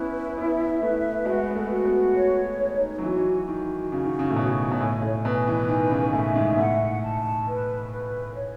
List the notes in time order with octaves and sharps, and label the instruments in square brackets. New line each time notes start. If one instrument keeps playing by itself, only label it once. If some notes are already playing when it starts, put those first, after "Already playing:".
Already playing: [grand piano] B3 C#4 [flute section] E4 B4
[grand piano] B3 [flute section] E5
[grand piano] A3 [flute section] B4
[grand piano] G#3 [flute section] F#4
[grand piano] B3
A3
[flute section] F#4
[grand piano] B3
[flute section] C#5
D#4
[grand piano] F#3
[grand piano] E3 [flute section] F#4
[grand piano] D#3 [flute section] F#4
[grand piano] C#3 [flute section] F#4
[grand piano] D#3
C#3
A2
[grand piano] B2 [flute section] C#5
[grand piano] B2
[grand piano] A2 [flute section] G#5
[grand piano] A2
[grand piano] B2 [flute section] B4
[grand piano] E3
[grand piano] D#3 [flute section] G#5
[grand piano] C#3
[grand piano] A2 [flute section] E5
[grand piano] G#2
[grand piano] A2 [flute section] F#5
[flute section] A5
B4
B4
C#5